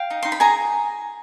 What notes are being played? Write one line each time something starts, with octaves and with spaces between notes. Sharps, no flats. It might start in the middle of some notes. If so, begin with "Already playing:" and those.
Already playing: F5 G5
D#4
D#4 C6
B5
G#4 G#5 A#5